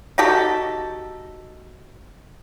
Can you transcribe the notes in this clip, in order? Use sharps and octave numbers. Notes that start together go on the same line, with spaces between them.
D#4 F#4 G4 A4